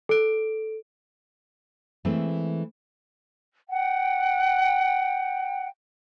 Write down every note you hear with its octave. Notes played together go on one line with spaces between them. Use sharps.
A4 D7
E3 G#3 A3 C4
F#5 G5